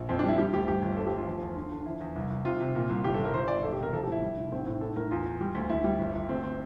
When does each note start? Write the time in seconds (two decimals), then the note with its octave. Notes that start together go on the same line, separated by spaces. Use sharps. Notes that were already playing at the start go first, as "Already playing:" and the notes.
Already playing: A#1
0.09 F2 C4
0.19 D4
0.24 G3 E4
0.38 G3 G4
0.53 D2 G4
0.67 G2 G4
0.82 G1
0.97 D2 A4
1.07 G4
1.12 D2 F4
1.27 F3
1.41 E2
1.56 D3
1.72 D3
1.86 F3 E4
2.00 E2
2.16 C2
2.30 C2
2.45 C3 F4
2.60 C3
2.75 A#2
2.89 C2
3.04 G1 G4
3.14 A4
3.19 G1
3.24 A#4
3.34 G1 C5
3.48 G1 D5
3.63 E1 A4
3.72 G4
3.79 C3 A#4
3.92 F3 A4
4.03 G4
4.07 A1 E4
4.22 G3
4.37 F1
4.52 A1 C4
4.67 A2
4.81 A2 A4
4.96 A2 A#4
5.11 E2 F4
5.25 E2
5.41 G3
5.55 D2
5.69 D2 E4
5.84 G3
5.99 G1
6.15 G1
6.29 D2 C4
6.43 C4